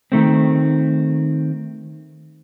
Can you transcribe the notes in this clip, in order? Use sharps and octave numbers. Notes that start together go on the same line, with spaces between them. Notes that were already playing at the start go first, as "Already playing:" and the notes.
D#3 A3 C4